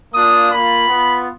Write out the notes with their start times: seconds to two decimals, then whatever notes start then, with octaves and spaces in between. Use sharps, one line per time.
0.12 A#3 D4 F4 D#6
0.50 A#3 F4 B5
0.87 B3 F4